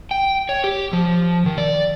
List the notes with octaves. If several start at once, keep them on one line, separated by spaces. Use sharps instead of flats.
G5
C#5
G4
F3
D#3
D5